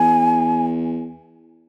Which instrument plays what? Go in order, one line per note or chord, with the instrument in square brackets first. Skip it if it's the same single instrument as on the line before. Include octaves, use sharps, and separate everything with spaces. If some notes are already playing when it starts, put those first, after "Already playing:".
Already playing: [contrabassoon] E2 [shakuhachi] G#5